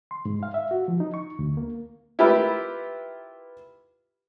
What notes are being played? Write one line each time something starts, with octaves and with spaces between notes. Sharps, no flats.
C6
G#2
F5
E5
F#4
F3
D#4
C#6
D2
A#3
E4 F4 G4 A#4 B4 E5